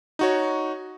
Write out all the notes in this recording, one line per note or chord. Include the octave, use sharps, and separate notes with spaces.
D#4 F#4 C#5